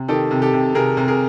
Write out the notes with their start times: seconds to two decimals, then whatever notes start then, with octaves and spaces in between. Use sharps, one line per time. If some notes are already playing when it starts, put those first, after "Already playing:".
Already playing: C3
0.08 D#3 G4 A4
0.31 C3
0.42 G4 A4
0.53 C3
0.74 C3 G#4 A#4
0.97 C3
1.08 G#4 A#4